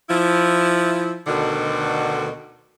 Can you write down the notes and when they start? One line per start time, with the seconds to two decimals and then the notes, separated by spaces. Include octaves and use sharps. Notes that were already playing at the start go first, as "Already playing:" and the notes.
0.09 F3 E4
1.27 D2 B2 D3 D#3 F#4